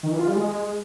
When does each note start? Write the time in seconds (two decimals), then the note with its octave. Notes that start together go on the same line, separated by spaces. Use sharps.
0.03 D#3
0.11 E3
0.19 F4
0.27 G3
0.35 G#3